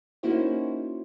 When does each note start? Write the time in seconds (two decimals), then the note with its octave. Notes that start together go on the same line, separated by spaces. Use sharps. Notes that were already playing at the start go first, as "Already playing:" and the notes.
0.23 A#3 C#4 D#4 E4 F#4 C5